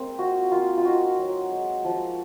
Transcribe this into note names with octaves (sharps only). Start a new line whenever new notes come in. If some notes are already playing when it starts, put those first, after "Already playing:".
Already playing: G#3 A#3 C4
F4 F#4
A#3 F4
F4
D#4 F#4
F#3
G#3
F3